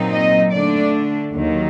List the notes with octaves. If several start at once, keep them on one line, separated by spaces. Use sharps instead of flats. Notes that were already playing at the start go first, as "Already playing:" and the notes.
Already playing: A#2 F#3 C4 D#4
D#5
D3 A3 D4 D5
D#2 D#3 F#3